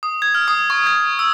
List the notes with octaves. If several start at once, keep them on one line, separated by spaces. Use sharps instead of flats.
D#6
G#6
F6
D#6
C#6
G#6
E6